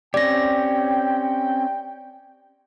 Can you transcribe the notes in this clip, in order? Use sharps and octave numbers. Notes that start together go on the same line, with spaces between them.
C4 C#4 G4 D5 G5 A#6